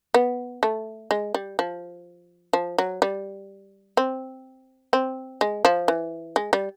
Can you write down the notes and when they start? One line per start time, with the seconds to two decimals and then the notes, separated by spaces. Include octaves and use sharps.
0.14 B3
0.63 A3
1.11 G#3
1.34 G3
1.59 F3
2.53 F3
2.78 F#3
3.02 G3
3.97 C4
4.93 C4
5.41 G#3
5.65 F3
5.88 E3
6.36 G#3
6.53 G3